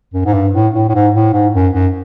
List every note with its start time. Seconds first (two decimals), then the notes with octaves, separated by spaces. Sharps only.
0.14 F#2
0.25 G#2
0.34 G2
0.54 A2
0.74 A2
0.89 A2
0.94 G#2
1.14 A2
1.33 G#2
1.54 F#2
1.73 F#2